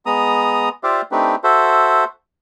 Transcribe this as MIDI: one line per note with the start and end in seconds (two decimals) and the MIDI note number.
0.06 0.69 56
0.06 0.69 59
0.06 0.69 82
0.06 0.69 87
0.83 1.02 65
0.83 1.02 67
0.83 1.02 72
0.83 1.02 74
0.83 1.02 76
0.83 1.02 77
1.12 1.35 57
1.12 1.35 60
1.12 1.35 62
1.12 1.35 63
1.12 1.35 67
1.12 1.35 71
1.44 2.04 66
1.44 2.04 69
1.44 2.04 72
1.44 2.04 76